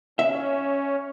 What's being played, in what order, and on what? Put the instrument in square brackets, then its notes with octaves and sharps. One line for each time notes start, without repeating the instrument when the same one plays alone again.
[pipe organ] C#4 [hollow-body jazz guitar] E5